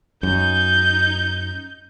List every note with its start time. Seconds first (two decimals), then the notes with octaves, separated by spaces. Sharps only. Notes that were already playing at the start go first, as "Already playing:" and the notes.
0.23 F#2 D#4 G6